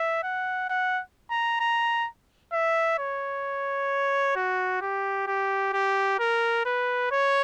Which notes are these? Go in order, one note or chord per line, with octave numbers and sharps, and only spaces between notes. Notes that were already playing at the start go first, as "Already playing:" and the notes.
Already playing: E5
F#5
F#5
A#5
A#5
E5
C#5
F#4
G4
G4
G4
A#4
B4
C#5